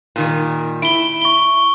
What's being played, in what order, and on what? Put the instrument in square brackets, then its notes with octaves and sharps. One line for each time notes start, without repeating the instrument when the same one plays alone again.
[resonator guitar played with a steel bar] A#2 D#3 G3
[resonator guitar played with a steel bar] E4 [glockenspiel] D7 G7
[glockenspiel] C#6 G7